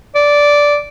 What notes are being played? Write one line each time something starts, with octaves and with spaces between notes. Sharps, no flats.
D5